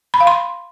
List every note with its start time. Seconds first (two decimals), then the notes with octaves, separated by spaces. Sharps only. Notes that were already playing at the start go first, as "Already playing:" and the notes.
0.14 B5
0.20 F5
0.27 C6